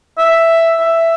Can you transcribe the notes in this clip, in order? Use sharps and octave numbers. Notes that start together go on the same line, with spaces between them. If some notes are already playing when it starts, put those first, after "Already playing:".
E5
E5